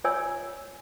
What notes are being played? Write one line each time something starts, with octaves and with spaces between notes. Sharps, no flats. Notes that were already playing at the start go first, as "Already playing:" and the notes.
F4 C#5 D5 G#5 E6